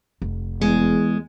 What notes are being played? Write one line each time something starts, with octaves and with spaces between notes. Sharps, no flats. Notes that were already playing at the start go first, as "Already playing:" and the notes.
F1
E2 G#3